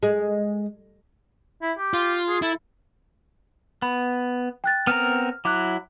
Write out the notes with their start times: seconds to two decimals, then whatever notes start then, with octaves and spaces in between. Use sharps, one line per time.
0.03 G#3
1.62 E4
1.78 G4
1.94 F4
2.28 G#4
2.42 E4 A4
3.82 B3 B5
4.64 G5 F#6 A6
4.87 B3 C4 A#4 F6
5.45 F#3 E4 D6 F#6